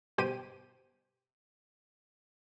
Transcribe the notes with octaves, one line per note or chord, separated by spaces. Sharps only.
G1 B2 G4 C5 G5 D#7